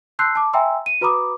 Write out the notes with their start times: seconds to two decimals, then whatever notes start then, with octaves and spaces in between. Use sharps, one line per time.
0.19 A5 C6 E6 F#6 G6 C7
0.35 A5 D6
0.53 E5 G5 G#5 A#5 C6 E6
0.86 D#7
1.01 F#4 B4 A#5 B5 D6 D#6